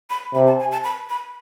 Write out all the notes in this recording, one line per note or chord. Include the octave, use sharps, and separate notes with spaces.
B5
C3 B5
A5
G#5
A5
B5
B5